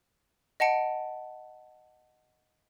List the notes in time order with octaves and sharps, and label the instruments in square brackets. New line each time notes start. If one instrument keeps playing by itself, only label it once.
[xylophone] D#5 F#5 A5 C#7 D7